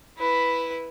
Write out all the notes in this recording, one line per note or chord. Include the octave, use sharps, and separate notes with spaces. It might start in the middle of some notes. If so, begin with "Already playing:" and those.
E4 B4